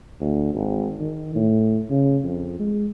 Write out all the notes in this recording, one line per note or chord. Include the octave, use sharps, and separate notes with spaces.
D2
G#1
D#3
A2
C#3
F2
G#3